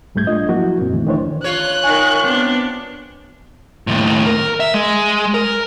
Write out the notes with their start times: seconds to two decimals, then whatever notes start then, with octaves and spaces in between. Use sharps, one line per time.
0.15 C2 G#2 G3 A3 G6 G#6
0.27 D4 F4 D#5
0.48 F3 F#3 A#3 E4 F#4
0.80 F#2 A#2 C4
0.93 C2 D#3 E3 A3
1.06 D2 D#3 E3 D4 C5 C#5
1.44 F4 C#5 F#6
1.83 D#3 G#5 C#6
2.23 B3 C4 D4
3.87 D#2 A2
4.27 A#4
4.60 E5
4.74 G#3
5.34 A#4